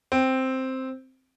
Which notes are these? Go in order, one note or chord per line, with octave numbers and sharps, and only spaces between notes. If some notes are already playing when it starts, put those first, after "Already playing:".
C4